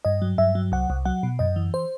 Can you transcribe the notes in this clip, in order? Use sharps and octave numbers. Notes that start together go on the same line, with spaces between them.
G2 D#5
F#3
G2 E5
F#3
C2 F#5
C2
F#3 F#5
B2
F#2 D#5
E3
C5